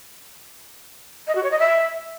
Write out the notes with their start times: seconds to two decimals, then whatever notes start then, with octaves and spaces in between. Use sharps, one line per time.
1.27 D#5
1.35 F#4
1.43 C#5
1.51 D#5
1.59 E5